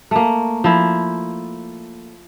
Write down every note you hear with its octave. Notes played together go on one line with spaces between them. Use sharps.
A3 A#3
F3 E4